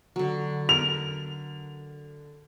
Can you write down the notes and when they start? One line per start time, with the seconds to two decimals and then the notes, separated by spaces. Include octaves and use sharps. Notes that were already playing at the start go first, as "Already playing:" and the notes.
0.16 D3 F#3
0.69 A#4 F7